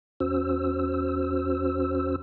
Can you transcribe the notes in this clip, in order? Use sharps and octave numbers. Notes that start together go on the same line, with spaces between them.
E2 C#4 F#4 C5 E6